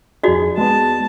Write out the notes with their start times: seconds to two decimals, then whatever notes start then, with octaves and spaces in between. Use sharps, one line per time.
0.24 F2 D#4 F#4 G#4 D5
0.58 G#3 B3 A5